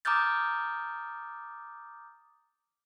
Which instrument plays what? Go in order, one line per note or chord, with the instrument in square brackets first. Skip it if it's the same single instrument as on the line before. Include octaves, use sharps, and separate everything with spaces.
[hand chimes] A#5 D6 D#6 F6 G6 A6